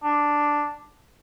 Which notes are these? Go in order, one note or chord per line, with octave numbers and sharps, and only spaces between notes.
D4